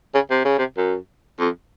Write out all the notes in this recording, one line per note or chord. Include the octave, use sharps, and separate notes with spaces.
C#3
C3
C#3
C3
F#2
F2